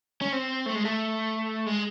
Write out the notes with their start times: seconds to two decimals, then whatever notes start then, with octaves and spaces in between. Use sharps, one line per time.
0.21 C#4
0.32 C4
0.66 A3
0.75 G#3
0.85 A3
1.66 G#3